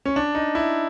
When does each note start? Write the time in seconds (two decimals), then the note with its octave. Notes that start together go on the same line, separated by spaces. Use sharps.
0.05 C#4
0.16 D4
0.35 D#4
0.55 E4